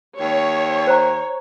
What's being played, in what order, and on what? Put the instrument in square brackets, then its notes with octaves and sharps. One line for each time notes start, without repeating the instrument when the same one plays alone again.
[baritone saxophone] D#2 [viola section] C#5
[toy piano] C5 A#5